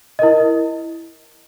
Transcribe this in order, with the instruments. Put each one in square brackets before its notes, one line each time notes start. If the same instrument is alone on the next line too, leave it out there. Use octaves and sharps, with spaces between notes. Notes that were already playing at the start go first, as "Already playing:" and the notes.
[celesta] E4 A#4 D#5